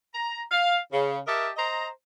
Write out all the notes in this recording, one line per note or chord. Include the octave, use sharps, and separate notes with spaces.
A#5
F5
C#3
G4 A#4 D#5 E5 A5
C5 D#5 A#5